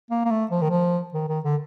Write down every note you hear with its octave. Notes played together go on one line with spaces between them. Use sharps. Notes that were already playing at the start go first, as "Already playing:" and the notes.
A#3
A#3
A3
F3
D#3
F3
D#3
D#3
D3